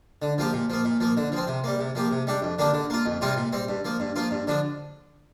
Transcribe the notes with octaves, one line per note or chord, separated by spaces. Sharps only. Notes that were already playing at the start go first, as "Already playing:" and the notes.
D3
F3 A#3 G4
A#2
F3 A#3
A#2
F3 A#3
D3
F3 C4
C3
G3 A#3
C3
F3 A#3 G4
C3
G3 D4 G4
F2
D3 A#3 D4 G4
D3
A#3 F4
F2
C3 G3 C4 F4
A#2
G3 C4
G2
F3 A#3
G2
F3 A#3 F4
G2
D3 F3 D4